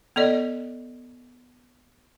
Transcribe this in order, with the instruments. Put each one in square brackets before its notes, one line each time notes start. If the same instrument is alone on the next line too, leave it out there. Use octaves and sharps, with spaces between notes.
[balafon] B3 A4 D5 D#5